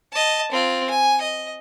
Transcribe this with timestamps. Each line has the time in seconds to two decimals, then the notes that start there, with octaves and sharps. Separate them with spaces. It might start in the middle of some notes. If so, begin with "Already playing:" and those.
0.13 D#5 A5
0.52 C4 F4
0.90 G#5
1.21 D#5